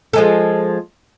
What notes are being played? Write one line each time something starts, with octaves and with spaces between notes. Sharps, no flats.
F3 G#3 A4